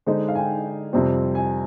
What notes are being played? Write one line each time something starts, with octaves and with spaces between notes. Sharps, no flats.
D3 G#3 D#4 C5
F5
G#5
G5
F2 C3 G3 C4
G#5